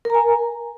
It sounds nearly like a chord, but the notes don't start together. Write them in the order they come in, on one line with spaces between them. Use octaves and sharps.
A#4 A#5 G#5